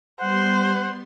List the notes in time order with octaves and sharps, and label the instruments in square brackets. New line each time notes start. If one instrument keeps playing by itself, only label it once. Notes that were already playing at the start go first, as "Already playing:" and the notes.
[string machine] G3 B3 C6 [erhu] C5 [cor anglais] F#5